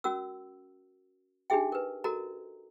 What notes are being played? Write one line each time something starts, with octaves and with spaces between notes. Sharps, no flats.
C#4 F#4 A#4 E6
D4 D#4 G4 G#4 E5 G5
A#4 B4
F#4 A4 A#4 D#5 A#5